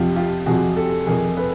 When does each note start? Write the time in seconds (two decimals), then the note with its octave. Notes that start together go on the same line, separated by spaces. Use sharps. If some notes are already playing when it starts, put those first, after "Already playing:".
Already playing: F2 C3 F3 F4 G4
0.16 F4 G4
0.46 F2 C3 F3 F#4 G#4
0.76 G4 A4
1.07 F2 C3 F3 G#4 A#4
1.37 A4 B4